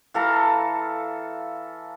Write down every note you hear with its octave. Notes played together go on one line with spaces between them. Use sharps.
E3 A4 F5 A#5